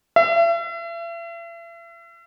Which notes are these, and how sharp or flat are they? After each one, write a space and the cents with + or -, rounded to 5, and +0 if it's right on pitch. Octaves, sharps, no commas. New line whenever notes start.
E5 +40